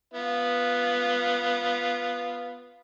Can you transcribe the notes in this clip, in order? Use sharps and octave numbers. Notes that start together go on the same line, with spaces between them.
B3 F4